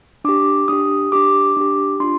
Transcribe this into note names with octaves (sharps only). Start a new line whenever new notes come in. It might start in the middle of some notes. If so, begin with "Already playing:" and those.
D4 G4 D6
D4 G4 D#6
D4 G4 D6
D4 G4
D4 F4 C6